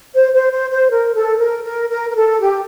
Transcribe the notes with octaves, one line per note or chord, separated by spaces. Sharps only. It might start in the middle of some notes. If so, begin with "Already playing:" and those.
C5
C5
C5
C5
A#4
A4
A#4
A#4
A#4
A#4
A4
G4